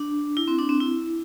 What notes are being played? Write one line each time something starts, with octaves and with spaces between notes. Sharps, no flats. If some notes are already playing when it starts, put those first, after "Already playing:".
Already playing: D4
E4
C4
D4
C4
E4